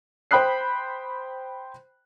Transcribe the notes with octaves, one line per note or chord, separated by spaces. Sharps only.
C5 G5 B5 D#6 F#6 C7